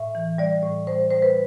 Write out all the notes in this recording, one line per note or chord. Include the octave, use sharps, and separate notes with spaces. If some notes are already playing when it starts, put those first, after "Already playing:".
Already playing: A2 E5
E3
G3 D5
A2
G3 C5
G3 C5
B4